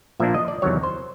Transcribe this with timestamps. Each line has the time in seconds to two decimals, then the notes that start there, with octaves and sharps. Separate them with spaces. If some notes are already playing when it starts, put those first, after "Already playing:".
0.20 A#2 F3 A#3 D4 E5
0.34 D#5
0.48 D5
0.62 E2 C3 D#3 F#3 C#5
0.83 C5